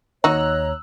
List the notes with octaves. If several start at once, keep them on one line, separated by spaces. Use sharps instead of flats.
D#2 D#4 F#4 C#5 A#5 E6 F#6